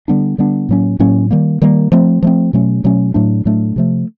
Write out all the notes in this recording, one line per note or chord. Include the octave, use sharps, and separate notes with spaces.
D3 G3 B3 D4
D3 G3 B3 D4
A2 F#3 A#3 C#4
A2 F#3 A#3 C#4
D#3 G3 A#3
D#3 G3 A#3
F3 A3 C4
F3 A3 C4
B2 F#3 A3 C#4
B2 F#3 A3 C#4
A2 F#3 A3 D4
A2 F#3 A3 D4
C3 F3 A3